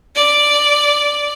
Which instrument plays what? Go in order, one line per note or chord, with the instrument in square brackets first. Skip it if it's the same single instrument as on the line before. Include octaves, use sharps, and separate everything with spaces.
[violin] D5